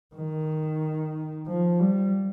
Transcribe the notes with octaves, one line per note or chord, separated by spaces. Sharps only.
D#3
F3
G3